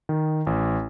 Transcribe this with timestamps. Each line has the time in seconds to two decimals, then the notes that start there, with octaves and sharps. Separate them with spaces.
0.09 D#3
0.47 A1